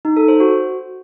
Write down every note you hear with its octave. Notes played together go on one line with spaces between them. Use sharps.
D#4
A4
C5
F#4